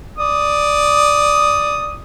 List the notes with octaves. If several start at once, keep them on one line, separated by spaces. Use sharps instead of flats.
D5 D#6